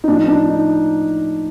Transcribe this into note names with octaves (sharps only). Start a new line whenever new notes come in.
D#4
A2 F3 D4
D#4
D4
D#4